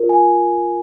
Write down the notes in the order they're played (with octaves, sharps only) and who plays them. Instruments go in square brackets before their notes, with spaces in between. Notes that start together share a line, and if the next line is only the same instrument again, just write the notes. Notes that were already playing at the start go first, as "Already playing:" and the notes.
Already playing: [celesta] F4 A#4
G#5